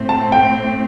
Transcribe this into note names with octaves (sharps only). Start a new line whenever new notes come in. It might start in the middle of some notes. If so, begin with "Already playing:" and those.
Already playing: A2 A3 C4
A5
G5